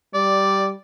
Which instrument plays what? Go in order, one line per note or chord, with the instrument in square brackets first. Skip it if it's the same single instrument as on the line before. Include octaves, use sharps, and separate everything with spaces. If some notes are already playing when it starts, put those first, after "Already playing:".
[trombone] G3 [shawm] D5